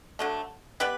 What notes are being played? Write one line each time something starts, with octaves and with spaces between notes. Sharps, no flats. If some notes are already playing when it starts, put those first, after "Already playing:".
D3 F#3 A3
G3 B3 G4 B4